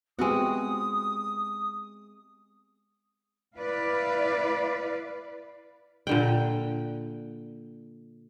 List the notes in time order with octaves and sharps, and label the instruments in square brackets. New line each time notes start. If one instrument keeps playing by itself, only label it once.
[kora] G#3 E4 F#4 [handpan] B3 C4 G4 [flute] D#6
[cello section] E4 B4 D5 F5
[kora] A#2 D3 G5